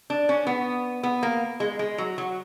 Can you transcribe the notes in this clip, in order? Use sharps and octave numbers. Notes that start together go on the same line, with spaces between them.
D4
C#4
B3
B3
A#3
G#3
G#3
F#3
F#3